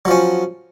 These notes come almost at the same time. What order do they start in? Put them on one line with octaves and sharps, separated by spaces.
F#3 F3 C#4